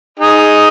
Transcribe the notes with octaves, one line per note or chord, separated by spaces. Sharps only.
D#4 G#4